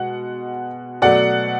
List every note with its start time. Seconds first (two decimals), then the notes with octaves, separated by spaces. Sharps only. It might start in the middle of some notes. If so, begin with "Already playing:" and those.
Already playing: B2 G#3 F#5
1.02 B2 F#3 A3 D5 F#5